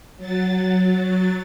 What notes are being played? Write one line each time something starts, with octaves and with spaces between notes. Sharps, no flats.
F#3 A6